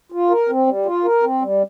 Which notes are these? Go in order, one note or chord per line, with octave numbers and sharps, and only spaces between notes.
F4
A#4
C4
G3
F4
A#4
C4
G3